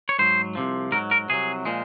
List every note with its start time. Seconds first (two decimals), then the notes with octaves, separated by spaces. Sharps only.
0.09 C#5
0.19 G#2 F#3 C5
0.55 C2 C3 F3
0.92 G#2 F#3 A#4
1.11 A#4
1.29 C2 C3 F#3 G#4
1.66 A#2 F3 G#3